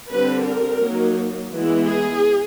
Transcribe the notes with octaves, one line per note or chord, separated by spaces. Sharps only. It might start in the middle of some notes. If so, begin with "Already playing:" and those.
D3 G3 C4 B4
A#4
F#3 A#3 D#4
E3 G#3 B3 E4
G#4